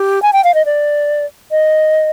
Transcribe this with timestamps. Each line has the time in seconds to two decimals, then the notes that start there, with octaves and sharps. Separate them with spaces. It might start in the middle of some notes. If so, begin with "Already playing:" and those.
Already playing: G4
0.22 G#5
0.33 G5
0.44 F5
0.54 D#5
0.66 D5
1.51 D#5